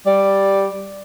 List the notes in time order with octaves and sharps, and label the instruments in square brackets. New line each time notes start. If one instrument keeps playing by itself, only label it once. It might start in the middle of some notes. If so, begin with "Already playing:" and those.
[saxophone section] G3 D5